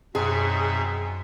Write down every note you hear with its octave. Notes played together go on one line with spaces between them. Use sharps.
F#2 B2 C4 D#4 G#4 E5 F#5 C6